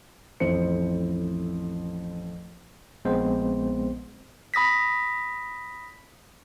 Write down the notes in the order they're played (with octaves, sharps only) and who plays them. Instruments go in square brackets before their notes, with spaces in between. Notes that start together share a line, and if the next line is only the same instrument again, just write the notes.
[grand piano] A1 F2 E4 C5 C#7
[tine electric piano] A#1 G#3 B3 C4 C5
[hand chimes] B5 D#6 A#6 B6